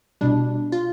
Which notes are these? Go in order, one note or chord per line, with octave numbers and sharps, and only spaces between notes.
C2 B2 G3 D4
F4